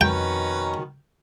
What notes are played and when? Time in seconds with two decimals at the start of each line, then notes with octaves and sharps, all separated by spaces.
0.01 F2 B2 D#3 C#4 B4 G5 A#5